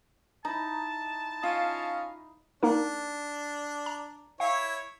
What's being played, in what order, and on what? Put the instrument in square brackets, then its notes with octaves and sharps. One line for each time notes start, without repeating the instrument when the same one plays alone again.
[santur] D#4 E4 [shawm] A5 [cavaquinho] A#5
[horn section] C#4 D#5 F5 [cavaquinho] F4
[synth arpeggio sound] A#3 D#4 A#4 [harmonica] D4
[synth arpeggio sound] A#5
[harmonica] E4 C#5 [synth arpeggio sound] F5